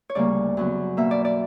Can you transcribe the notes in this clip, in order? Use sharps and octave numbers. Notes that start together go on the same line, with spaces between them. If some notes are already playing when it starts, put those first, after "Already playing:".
C#5
D2 C#3 G3 A#3 D5
F#2 C#3 F#3 B3
B2 A#3 E5
D5
D5